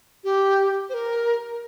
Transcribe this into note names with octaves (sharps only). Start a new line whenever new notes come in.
G4
C5
A#4